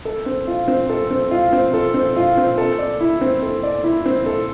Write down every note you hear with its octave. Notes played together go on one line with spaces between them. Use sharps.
A4
C4
F4
C4
A4
C4
F4
C4
A4
C4
F4
C4
A4
D5
E4
C4
A4
D5
E4
C4
A4